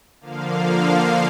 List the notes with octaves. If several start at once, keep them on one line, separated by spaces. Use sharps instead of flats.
D3 F3 A#3 F5